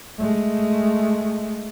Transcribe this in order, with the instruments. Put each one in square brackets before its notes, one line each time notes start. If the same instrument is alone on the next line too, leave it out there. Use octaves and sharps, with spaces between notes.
[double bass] G#3 A3